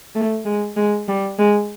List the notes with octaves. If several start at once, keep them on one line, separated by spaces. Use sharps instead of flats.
A3
G#3
G#3
G3
G#3